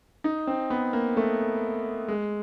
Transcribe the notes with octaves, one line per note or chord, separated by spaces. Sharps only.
D#4
C4
B3
A#3
A3
G#3